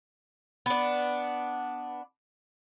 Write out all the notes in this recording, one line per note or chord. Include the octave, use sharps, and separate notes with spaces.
B3 D4